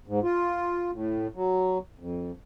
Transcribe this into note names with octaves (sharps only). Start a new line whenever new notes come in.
G#2
F4
A2
F#3
F2